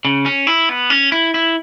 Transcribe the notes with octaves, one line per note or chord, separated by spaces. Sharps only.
C#3
C#4
E4
B3
C#4
E4
E4